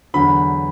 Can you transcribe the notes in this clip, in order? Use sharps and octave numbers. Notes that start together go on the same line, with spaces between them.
E2 D3 F#3 B5